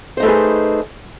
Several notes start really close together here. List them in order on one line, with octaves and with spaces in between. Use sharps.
C5 D#4 A3 B4 G#4